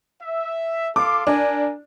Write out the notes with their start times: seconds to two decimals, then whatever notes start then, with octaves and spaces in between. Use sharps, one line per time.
0.21 E5
0.96 A4 F5 C6 D6
1.27 D4 A#4 G#5